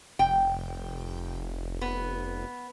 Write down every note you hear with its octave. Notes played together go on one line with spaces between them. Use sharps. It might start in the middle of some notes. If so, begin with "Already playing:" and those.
F1 G5
B3